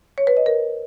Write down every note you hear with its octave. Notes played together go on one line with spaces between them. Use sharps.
C#5
B4
D#5
A#4